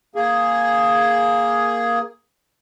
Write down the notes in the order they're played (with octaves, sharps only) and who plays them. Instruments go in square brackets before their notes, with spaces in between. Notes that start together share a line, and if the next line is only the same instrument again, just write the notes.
[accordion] A#3 G#4